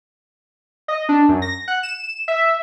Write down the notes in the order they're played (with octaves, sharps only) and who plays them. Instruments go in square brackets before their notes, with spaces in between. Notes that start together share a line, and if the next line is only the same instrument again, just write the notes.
[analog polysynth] D#5
D4
F#2
A#6
F#5
E7
E5